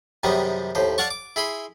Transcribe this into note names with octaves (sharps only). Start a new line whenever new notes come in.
F#2 C3 D#3 G3 G#3 B3
D#2 A2 C5
C#5 D5 F5 F#5 A5 C#6
D6
E4 G#4 B5 C6